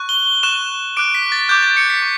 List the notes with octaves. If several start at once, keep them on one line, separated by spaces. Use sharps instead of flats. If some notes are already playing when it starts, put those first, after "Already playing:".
Already playing: C#6 F#6
G7
C#6 F#6 E7
D6 F#6 D7
B6
A6
D6 F#6 G6
A6
C#7
B6
C#6